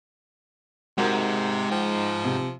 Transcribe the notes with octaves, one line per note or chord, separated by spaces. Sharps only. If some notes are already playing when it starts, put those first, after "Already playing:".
G#2 C3 F#4 A#4
F3 G5
C3